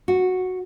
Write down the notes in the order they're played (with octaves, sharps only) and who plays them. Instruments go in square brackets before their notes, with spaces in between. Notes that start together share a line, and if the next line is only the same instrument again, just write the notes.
[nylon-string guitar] F#4